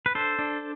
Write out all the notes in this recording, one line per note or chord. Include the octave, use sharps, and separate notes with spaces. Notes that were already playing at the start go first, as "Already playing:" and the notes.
B4
D4 A4 C5
D4